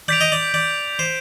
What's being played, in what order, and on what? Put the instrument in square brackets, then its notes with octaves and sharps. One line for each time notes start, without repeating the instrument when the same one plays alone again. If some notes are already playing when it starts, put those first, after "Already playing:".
[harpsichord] D5 [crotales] G6 B6 D7 F7
[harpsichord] D#5
D5
D5
C5